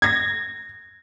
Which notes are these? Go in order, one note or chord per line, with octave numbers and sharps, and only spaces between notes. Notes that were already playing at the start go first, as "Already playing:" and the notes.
G#6 A#6